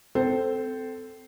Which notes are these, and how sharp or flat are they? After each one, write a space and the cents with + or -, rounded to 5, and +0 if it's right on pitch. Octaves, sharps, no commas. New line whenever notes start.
C4 -25 A4 +0 C5 +0